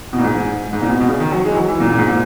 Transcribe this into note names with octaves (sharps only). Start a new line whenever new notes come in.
B2
A#2
G#2
G#2
G#2
A#2
B2
B2
C#3
D#3
F#3
G#3
E3
F#3
E3
A#2
A#2
G#2
A#2